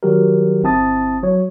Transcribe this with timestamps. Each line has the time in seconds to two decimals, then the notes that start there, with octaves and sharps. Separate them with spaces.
0.03 D#3 F#3 G3 F#4 G4 A#4
0.63 G1 C4 E4 A5 D#6 A6
1.23 F#3 C#5